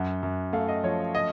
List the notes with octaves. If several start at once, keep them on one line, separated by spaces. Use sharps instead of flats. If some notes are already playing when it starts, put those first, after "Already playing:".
Already playing: F#2 F#5
F#2
A3 F5
D#5
F3 C#5
D#5